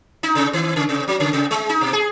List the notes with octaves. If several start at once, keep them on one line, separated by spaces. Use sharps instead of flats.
D#4
C3
D#3
C#3
C3
F#3
C#3
C3
G#3
D#4
B2
G#4